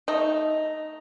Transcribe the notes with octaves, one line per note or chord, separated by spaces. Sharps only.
A3 D#4